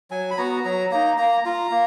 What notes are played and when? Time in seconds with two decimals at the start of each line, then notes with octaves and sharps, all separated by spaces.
0.11 F#3 G#5
0.31 B5
0.38 B3 F#4 A#5
0.65 F#3 A#5
0.91 A#3 D#4 A#5
1.18 A#3 A#5
1.45 F4 A#5
1.71 A#3